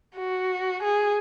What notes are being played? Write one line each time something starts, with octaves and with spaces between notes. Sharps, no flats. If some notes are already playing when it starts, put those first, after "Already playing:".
F#4
G#4